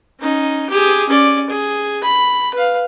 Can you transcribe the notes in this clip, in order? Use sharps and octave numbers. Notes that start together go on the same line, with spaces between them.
C#4 D#4
G4 G#4
C#4 D5
G#4
B5
B4 F5